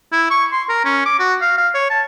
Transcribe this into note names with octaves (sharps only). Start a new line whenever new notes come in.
E4
C#6
C6
A#4
C#4
D6
F#4
F5
F5
C#5
A5